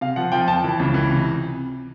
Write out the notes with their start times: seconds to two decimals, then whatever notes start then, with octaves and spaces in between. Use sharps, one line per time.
0.01 C3 F5
0.16 F3 F#5
0.32 F3 G5
0.48 F2 A5
0.64 E3
0.80 C#2
0.94 E3
1.11 C3